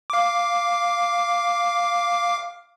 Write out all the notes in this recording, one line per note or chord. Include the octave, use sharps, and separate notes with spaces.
F5 D6